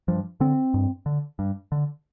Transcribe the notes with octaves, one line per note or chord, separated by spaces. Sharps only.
G2 F3
D3 C4
G2
D3
G2
D3